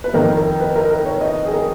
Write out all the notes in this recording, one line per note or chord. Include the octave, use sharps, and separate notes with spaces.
B4
F2 D#3 A#4
A#4
B4
A#4
A#4
C#5
D#5
G#4
A#4